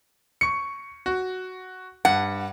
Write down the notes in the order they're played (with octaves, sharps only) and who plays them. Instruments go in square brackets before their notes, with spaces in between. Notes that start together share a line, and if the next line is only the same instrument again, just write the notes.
[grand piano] C#6 C#7
F#4
[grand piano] G2 [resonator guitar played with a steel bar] F#5